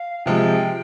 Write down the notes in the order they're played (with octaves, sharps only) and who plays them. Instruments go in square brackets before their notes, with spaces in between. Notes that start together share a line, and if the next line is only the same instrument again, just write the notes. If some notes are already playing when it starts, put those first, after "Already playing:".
Already playing: [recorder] F5
[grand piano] C3 F3 G#3 [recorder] G5